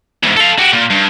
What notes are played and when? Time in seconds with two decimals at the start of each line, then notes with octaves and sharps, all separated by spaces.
0.24 E2 G#2
0.37 A4 F5
0.59 F#4 G4
0.73 A#2
0.91 G2